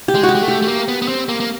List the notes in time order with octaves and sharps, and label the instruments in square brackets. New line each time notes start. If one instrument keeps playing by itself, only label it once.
[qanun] G4
[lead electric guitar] G#3
[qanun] F#4
G4
[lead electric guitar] G#3
A3
[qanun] G4
[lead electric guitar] A3
A#3
B3
B3
C4
A#3
A#3